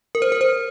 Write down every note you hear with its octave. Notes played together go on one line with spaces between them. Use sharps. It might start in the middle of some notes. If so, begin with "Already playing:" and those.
A#4
C5
A#4
C5